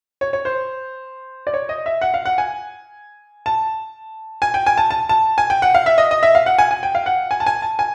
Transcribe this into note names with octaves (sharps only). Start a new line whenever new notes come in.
C#5
C#5
C5
D5
C#5
D#5
E5
F#5
F5
F#5
G#5
A5
G#5
G5
G#5
A5
A5
A5
G#5
G5
F#5
F5
E5
D#5
D#5
E5
F5
F#5
G#5
G#5
G5
F5
F#5
G#5
A5
G#5
A5
G#5